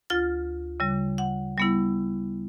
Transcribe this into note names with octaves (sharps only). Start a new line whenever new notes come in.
D2 F4 F6 A6
C#3 G3
F#5
G3 B3 E4